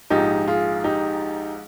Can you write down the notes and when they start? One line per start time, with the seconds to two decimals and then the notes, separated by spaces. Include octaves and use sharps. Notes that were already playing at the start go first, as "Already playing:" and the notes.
0.10 A#1 G#2 F3 G#3 D#4 G4
0.48 F4 G#4
0.84 D#4 G4